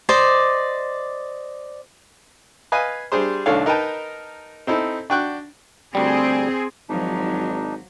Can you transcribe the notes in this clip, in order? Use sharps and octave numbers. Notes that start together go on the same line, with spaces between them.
C5 D5 D#5
B4 D#5 F5 G#5
G3 D4 G#4 C5 C6
C2 D#3 A3 D4 C#5 F5
D#4 A#4 B4 G5 A5
C4 D#4 E4 A4
D4 F#4 G5 C#6 F#6
D2 G3 C4 G#4
G#1 F3 F#3 D4 D#4